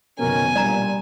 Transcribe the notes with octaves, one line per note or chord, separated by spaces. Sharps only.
F#1 B2 D#3 B3 C#4 A#4 G#5
A#2 G3 D4 D5 A#5